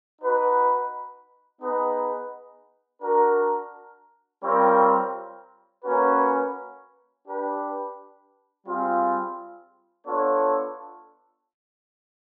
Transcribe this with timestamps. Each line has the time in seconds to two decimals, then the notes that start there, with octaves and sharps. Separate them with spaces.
0.21 D#4 F#4 B4
1.61 B3 D#4 G#4 B4 D#5
3.02 D4 F#4 A#4
4.42 G3 C4 F4 A#4 C#5
5.83 A#3 C#4 F#4 B4
7.25 D4 G4 B4
8.65 G3 C4 F4 G#4
10.06 B3 D4 F4 A4 C#5